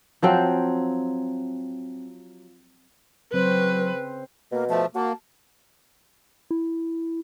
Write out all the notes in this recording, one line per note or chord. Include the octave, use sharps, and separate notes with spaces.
F3 F#3 C4 F4
C#3 F#3 C4 B4 C5
B2 A#3
F3 A3 A5
A#3 F#4 A5
E4